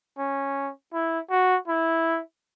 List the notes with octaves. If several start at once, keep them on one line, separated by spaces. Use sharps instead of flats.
C#4
E4
F#4
E4